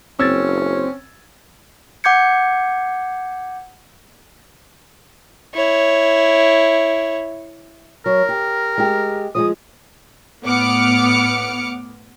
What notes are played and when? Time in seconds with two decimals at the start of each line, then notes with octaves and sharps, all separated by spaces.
0.19 F#1 C4 C#4 E6 G#6 A6
2.04 F#5 D6 G6 G#6 C#7
5.54 E4 C#5
8.06 F#3 A#4
8.29 G4
8.78 G#3 G4
9.35 F3 G3 G#3 D#6
10.43 A2 B3 F#5 D6 F6 C#7